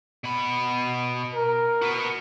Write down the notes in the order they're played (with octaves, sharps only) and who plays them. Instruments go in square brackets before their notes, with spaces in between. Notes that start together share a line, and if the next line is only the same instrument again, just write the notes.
[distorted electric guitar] B2 B5
[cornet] A#4
[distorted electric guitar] F#4 B4